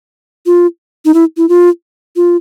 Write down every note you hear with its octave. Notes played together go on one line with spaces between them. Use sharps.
F4
D#4
E4
E4
F4
F4